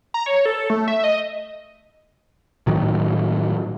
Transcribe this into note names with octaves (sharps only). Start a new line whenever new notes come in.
A#5
C#5
A4
A3
E5
D#5
A2 D#3 F#3